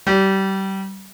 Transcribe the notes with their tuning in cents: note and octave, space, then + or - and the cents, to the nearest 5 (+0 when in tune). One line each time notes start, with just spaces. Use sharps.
G3 -25